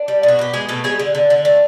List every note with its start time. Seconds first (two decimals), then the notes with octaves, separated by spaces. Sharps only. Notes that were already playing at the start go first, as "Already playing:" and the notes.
Already playing: D4
0.08 G3
0.23 B2
0.28 F#4
0.39 B2 G4
0.53 B2 G#3 G#4
0.69 B2 A3 A4
0.84 G3 G#3 G#4
0.99 D3
1.15 D3
1.30 D3
1.45 A3